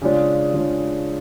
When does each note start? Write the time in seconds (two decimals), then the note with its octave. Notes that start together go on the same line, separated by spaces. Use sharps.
0.02 C#3 G#3 D4 F4
0.54 C#3 G#3 D4 F4